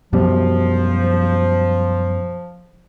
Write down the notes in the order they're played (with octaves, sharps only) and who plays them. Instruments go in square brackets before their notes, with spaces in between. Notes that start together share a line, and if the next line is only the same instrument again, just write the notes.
[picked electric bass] F#2 B2 G3 [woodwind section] F3